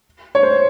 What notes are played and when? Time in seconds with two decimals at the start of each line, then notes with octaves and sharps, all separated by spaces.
0.35 C#5
0.43 C5